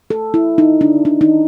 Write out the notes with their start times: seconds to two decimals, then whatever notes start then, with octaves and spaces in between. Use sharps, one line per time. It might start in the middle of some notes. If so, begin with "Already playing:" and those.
0.10 A4
0.34 E4
0.58 D#4
0.81 D4
1.05 D4
1.21 D#4